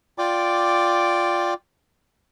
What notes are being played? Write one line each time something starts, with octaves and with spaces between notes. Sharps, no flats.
F4 D5 G5 D6